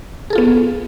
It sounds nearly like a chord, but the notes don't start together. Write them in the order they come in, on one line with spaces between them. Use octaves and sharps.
G#4 A4 F4 B3